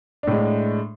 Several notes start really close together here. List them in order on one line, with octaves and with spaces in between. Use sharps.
D4 A2 G#3